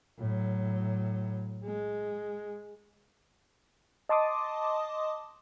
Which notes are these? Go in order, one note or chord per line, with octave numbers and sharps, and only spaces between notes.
A2 F#3
G#3
D#5 A5 C6 D6 D#6